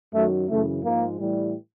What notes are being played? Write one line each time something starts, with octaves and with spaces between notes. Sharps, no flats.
F#2 D#3 F#3 A3
F#2 C#3 E3 A3
G#2 F3 G#3 A#3
A2 E3 G3